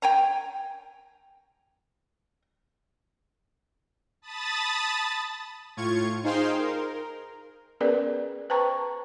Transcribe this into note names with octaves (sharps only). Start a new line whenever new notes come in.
G5 G#5 A#5
A5 B5 D#6 A6
A2 F4 C#6 G#6
D#4 G#4 C5 F5 G5 C6
A#4
B3 C#4 G#4 A#4 B4 D5
B4 C5 G5 A5 A#5 C#6